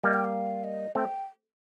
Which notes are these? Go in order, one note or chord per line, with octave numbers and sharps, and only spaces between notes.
G3 A#3 D#5
G5
F5
D#5
A3 C4 G5